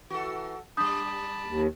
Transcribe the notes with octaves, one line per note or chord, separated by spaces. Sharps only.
E3 F#4 A4
G3 D4 A5 B5 D#6 G6
D#2